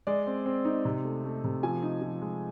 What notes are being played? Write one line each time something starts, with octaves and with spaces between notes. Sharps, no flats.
G#3 D5
C4
C4
D#4
C3
A3
A3
C3
F3 G#5
D#4
F3
G#3